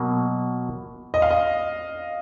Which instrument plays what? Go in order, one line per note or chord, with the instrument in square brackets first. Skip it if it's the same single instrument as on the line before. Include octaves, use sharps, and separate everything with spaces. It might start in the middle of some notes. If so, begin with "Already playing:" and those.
Already playing: [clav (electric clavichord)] B2 F#3 A#3
[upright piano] D#5
F5
D#5